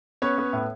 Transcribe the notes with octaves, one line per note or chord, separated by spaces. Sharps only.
B3 C#4 C#5
B3
A2